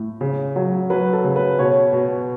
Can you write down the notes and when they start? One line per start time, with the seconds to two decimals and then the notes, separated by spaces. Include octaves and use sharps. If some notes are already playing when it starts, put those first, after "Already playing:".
Already playing: A2
0.21 C#3
0.56 F#3
0.90 F#3 B4
1.13 A4
1.24 C#3
1.36 B4
1.59 B2 C#5
1.93 B2